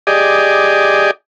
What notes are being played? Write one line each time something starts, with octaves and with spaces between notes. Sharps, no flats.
G4 G#4 D5 D#5